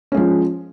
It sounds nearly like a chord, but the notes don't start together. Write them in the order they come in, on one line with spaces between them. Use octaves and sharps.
C#4 G#3 F3